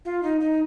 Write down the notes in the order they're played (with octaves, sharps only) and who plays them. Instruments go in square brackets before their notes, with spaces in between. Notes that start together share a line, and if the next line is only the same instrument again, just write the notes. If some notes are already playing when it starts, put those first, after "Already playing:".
[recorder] F4
D#4
D#4